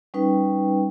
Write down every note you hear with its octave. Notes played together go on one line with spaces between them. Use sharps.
G3 C#4 D#4 B4 G5